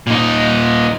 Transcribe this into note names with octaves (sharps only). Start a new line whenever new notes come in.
A#2 D#4